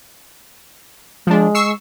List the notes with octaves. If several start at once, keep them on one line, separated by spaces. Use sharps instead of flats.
F3 G#3 D4
C#6 E6 C7